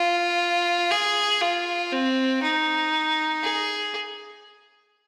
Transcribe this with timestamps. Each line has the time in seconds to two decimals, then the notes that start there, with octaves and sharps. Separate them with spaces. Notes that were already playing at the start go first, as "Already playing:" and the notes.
Already playing: F4
0.91 G#4
1.41 F4
1.92 C4
2.43 D#4
3.43 G#4